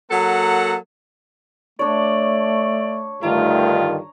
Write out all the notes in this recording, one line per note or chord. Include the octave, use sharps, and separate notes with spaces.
F#3 A#3 A4 F#5 A#5
A3 D4 C#5 D5
G2 D3 D#3 A3 F4 A#5